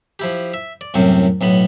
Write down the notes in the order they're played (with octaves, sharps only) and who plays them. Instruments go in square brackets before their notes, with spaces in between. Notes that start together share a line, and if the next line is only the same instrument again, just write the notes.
[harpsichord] F3 E4 G4
E5
D5
C2 F#2 A2 C3 C4
B1 A2 B3 B5